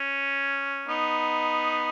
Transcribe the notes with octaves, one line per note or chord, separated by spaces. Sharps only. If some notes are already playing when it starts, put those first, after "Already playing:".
Already playing: C#4
B3 D#4